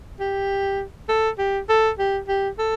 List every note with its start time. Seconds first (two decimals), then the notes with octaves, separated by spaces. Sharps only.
0.20 G4
1.09 A4
1.38 G4
1.69 A4
1.99 G4
2.28 G4
2.59 A4